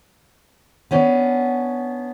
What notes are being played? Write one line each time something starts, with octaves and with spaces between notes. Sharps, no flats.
B3 C#4 D4